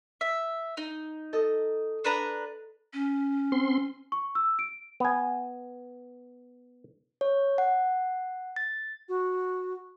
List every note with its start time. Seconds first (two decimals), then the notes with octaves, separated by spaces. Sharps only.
0.21 E5
0.77 D#4
1.33 A4 D#5
2.04 D4 B4 A#5
2.93 C#4
3.52 C4 C6
4.12 C#6
4.35 E6
4.59 D7
5.00 B3 G#5
7.21 C#5
7.58 F#5
8.56 A6
9.09 F#4